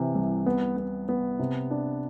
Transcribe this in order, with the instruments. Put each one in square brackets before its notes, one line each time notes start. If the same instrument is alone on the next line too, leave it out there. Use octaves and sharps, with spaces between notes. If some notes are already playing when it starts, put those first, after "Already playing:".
Already playing: [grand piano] C3 E3
C2
B3
B3
B3
C3
D4